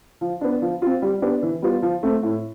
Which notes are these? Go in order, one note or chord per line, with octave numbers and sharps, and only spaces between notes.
F3
B3 D4
F3
C4 F4
G3
B3 D4 G4
E3
G3 B3 F4
F3
A3 C4
A2